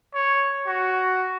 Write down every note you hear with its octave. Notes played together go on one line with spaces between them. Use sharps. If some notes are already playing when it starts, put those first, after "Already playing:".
C#5
F#4